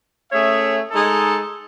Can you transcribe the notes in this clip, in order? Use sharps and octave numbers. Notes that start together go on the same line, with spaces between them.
A3 C#4 G#4 C#5 E5
G#3 D#4 A4